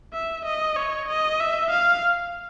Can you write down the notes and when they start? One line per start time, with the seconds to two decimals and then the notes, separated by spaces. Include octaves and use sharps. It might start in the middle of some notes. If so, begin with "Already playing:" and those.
0.14 E5
0.46 D#5
0.76 C#5
1.09 D#5
1.40 E5
1.71 F5